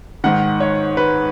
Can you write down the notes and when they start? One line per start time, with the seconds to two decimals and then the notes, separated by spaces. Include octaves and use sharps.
0.24 G#2 D#3 F#5
0.60 C#5
0.97 B4